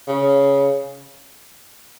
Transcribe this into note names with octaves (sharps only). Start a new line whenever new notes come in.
C#3